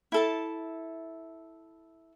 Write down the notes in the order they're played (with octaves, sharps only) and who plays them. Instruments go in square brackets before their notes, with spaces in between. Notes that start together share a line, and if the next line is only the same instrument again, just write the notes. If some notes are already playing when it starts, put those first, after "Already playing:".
[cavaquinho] E4 A4 A5